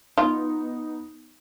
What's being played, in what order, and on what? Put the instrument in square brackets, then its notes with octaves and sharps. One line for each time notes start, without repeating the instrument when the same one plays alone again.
[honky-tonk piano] B3 D#4 [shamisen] F4